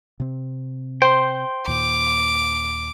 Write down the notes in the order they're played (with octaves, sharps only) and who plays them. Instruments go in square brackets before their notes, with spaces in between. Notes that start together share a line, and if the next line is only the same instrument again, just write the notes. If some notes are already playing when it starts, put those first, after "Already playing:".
[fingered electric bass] C3 C4
[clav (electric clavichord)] C5 [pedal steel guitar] G5 C6
[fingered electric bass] D#2 A#2 [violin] D6